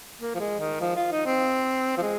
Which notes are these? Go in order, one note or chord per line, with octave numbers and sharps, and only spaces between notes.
A#3
F3
G#3
D#3
F3
F4
D#4
C4
F3
G#3